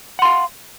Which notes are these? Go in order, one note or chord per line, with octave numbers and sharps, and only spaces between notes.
F5 F#5 C6